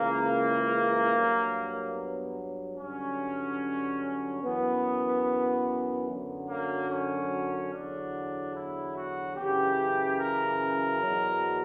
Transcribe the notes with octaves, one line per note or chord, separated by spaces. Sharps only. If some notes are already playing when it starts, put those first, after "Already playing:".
Already playing: C#2 C#3 E3 A#3
G2 F#3
B3
G2 D3 F#3 C#4
F#2 E3 B3
F#2 D3 F#3
A#3
C#4
E2 D3 F#3 D4
E4
F#4
F#2 C#3 E3 G4
A#4
E2 B2 F#3